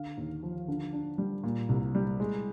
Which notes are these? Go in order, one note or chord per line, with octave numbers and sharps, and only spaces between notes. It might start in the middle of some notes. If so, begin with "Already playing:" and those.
Already playing: D3 F5
D#2
F3
D3
D4
G3
A#2
C2
G3
G#3